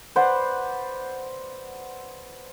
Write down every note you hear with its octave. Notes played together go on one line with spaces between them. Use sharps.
B4 C5 D5 F#5